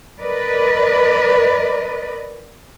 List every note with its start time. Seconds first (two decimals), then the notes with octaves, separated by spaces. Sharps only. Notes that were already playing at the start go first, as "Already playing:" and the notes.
0.20 A#4 B4 D5 D#5